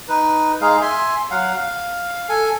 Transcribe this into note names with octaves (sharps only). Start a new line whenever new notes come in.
D#4 B4
G#3 D#4 G#4 F5
E5 G#5 C6
F#3 F5 F#5
F5
A4 G#5